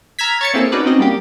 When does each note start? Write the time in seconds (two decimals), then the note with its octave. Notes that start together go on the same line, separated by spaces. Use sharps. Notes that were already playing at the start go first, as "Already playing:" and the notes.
0.19 A#5 E6 F6 G#6 B6
0.41 C#5 A6 C#7
0.54 A#3 C4 E4 G#4 A4
0.72 C#4 D#4 F#4 B4 D5
0.86 C4 C#4 D#4 F#4 D#5
0.99 G3 A#3 G4